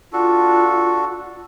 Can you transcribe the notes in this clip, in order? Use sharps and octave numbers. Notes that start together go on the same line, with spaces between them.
D4 F4 F#4 A4